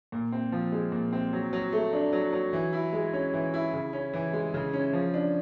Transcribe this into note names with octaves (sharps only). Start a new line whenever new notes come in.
A#2
C4
F3
G#3
A#2
C4
F#3
F#3
A3
D4
F#3
F#3
E3
E4
G#3
C#4
E3
E4
C#3
C#4
E3
G#3
C#3
C#4
F3
D4